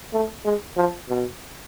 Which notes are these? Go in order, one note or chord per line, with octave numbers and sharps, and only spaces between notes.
A3
G#3
F3
B2